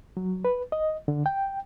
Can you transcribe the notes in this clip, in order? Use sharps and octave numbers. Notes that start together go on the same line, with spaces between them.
F#3
B4
D#5
D3
G5